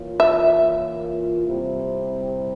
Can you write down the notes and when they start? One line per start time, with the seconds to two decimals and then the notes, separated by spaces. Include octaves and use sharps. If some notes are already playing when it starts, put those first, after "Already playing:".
Already playing: E3 A#3 F4 A#4 C#5
0.20 E5
1.46 C3 G3 C4 E4 G4